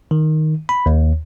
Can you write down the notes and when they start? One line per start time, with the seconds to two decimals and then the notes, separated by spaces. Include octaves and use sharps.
0.11 D#3
0.69 B5
0.86 D#2